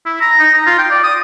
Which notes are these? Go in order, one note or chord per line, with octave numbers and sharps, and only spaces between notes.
E4
A#5
D#4
A#5
F4
G5
D5
D#6